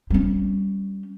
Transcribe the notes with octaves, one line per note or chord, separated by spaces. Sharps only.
G3 C#4